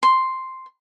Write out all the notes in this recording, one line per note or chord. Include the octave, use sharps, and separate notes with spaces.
C6